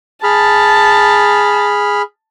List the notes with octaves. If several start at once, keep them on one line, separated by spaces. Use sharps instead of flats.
G#4 A5 B5 F6